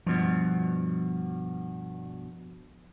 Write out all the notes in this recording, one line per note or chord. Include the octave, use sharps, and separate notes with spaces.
G2 B2 F3